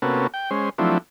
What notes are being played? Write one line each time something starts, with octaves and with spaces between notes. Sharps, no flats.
C3 A#3 B3 C#4 F#4 A4
G5
G#3 C#4 C5
F3 F#3 A3 C4 D4 E4